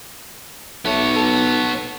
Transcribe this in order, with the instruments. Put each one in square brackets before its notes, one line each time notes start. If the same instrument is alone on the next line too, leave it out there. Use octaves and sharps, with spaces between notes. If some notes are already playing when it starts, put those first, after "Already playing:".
[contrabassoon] B1 [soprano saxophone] A3 [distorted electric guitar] B3 C#5
[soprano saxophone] A4